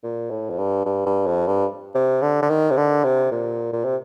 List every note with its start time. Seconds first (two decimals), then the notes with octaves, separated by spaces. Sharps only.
0.03 A#2
0.30 A2
0.50 F2
0.58 G2
0.85 G2
1.06 G2
1.26 F2
1.47 G2
1.95 C3
2.22 D3
2.42 D3
2.49 D#3
2.70 C3
2.77 D3
3.04 C3
3.31 A#2
3.73 A#2
3.85 C3